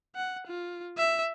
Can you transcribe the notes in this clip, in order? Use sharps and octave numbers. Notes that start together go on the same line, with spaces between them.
F#5
F4
E5